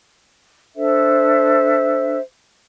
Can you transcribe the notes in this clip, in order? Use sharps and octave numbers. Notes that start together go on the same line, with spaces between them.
D4 A4 C5 E5